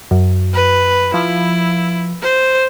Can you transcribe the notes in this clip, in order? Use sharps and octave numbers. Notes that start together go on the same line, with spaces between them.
F#2
B4
F3 E4
C5